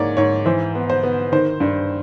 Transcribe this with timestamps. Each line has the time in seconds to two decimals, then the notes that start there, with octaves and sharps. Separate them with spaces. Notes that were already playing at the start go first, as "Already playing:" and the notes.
Already playing: G#2 A#3 C#5 D5
0.17 G#2 C#5
0.46 E3 C5
0.75 B3
0.90 C5
1.03 B3
1.32 D#3 C5
1.60 G2